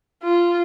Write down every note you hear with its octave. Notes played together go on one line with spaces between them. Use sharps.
F4